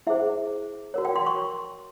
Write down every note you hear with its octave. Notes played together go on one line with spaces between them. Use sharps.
E4 G#4 C5 E5
F#4 A#4 C#5
G5
C6
C#6